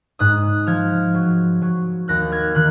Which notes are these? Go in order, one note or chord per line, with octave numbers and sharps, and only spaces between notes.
G#2 D#6 F#6
F3 F6 G#6
F#3
F#3
D#2 F#6 A#6
F6 G#6
D#3 F#6